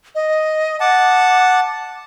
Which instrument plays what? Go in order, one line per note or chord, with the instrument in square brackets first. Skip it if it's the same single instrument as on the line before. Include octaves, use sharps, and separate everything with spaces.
[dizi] D#5
[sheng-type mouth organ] F#5 A5 [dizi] D6